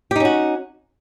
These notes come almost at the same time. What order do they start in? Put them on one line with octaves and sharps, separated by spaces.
G4 D#4 C#4 F#4